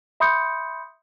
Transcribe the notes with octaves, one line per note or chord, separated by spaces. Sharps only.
E5 B5 C6 D#6 G6 C#7